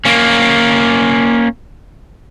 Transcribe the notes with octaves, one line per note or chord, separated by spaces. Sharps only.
A#3 C#4